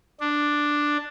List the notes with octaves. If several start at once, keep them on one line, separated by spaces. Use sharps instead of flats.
D4